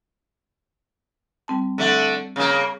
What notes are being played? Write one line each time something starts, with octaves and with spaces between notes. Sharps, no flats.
G3 C4 A5
D3 A3
C#3 A#3